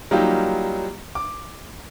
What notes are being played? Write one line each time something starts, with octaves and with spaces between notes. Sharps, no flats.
F#3 G3 A#3 D#4 F4 G4
D6